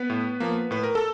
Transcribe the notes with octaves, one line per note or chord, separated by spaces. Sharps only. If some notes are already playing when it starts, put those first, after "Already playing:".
Already playing: B3 B4
A2
F3 A#3
A2 B4
A#4
A4